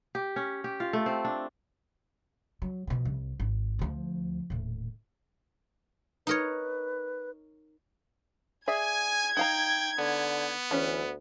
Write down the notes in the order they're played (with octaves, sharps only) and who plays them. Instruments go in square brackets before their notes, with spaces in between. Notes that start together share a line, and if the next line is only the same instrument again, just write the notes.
[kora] G4
C#4
G4
F4
A3
C4
D4
[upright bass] F#3
B2 F3
C2
G#1
D2 F3
D#1 A2
[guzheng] D#4 A#4 C#5 [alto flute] B4
[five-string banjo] G#4 D5 E5 [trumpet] G#5 [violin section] G#6
[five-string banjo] D#4 F5 A#5 [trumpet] G5
[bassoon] D3 [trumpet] B3
[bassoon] D2 [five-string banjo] E3 C#4